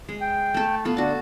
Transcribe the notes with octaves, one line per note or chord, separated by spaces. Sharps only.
G#3
G5
A3 A4
B3 F4 A4
D3 D4 F#4 A5